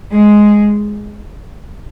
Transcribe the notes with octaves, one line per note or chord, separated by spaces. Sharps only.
G#3